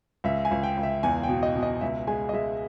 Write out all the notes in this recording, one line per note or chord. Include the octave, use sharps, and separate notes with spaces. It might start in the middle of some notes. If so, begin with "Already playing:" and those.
C#2 E5
G#5
C#2
G5
C#2
E5
E2 G#5
G5
B2
D#5
B2
D#5
C#2 E5
G#3 G#5
D#5
G#3 E5